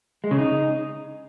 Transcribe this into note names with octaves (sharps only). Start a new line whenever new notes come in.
G#3
C#3
D#4